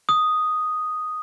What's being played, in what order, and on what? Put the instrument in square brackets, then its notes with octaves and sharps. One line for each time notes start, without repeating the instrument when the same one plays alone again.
[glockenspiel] D#6